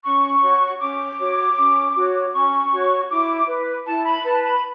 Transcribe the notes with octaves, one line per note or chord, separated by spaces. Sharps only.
C#4 C#6
F#4 C#5
C#4 D6
F#4 C#5
C#4
F#4 C#5
C#4 C#6
F#4 C#5
E4 D6
B4
E4 A5
B5
B4 A5
B5